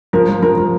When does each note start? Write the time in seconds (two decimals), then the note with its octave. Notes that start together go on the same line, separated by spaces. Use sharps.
0.13 F3 A#4
0.29 F3
0.42 F3 A#4
0.58 F3